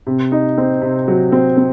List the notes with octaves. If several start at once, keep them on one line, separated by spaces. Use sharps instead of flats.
C3
D#4
C4
C3
F#3
C4
C4